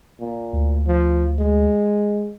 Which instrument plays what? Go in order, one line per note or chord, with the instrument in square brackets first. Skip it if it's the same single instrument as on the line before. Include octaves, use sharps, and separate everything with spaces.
[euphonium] A#2
[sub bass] D2
[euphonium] F3
G#3